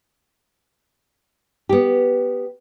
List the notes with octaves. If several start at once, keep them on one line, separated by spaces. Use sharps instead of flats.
B3 G4